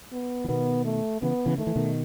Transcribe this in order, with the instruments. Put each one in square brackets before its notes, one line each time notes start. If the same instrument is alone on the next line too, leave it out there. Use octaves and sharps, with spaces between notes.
[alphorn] B3
[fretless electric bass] E3
[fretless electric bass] B2 D#3 [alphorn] B3
[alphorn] A3
[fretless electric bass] C#3 E3 [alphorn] B3
[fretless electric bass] C#3 E3
[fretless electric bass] D#3 [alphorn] A3
[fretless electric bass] E3
B2 D#3